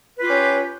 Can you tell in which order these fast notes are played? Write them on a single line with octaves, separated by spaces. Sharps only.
B4 F4 G4 C#4